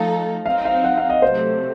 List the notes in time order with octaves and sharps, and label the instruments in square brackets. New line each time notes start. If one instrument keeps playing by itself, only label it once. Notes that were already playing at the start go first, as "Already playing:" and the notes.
Already playing: [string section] F3 A3 D#4 A4 [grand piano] F5
[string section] F#3 C4 D#4 [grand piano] F5
[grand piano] F5
F#5
F5
D#5
[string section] C3 F#3 A3 [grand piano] C5